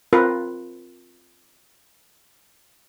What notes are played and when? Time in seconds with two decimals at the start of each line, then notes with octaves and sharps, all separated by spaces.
0.13 C4 F4 A#4 B4